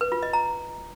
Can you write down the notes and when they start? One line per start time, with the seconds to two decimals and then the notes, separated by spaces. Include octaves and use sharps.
0.01 B4
0.12 F4
0.23 D#5
0.33 A#5